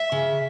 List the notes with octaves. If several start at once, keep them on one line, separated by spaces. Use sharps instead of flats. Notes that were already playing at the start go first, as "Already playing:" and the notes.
Already playing: E5
C#3